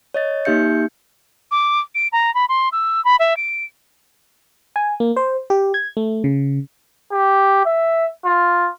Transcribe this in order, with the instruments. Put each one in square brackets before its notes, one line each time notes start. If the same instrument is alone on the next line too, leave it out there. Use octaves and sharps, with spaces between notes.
[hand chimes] C#5 D#5 A6
A#3 D#4 G4 E5 G6 C#7
[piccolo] D6
D7
A#5
B5
C6
E6
B5
E5
D7
[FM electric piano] G#5
A#3
C5
G4
G#6
A3
C#3
[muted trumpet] G4
E5
F4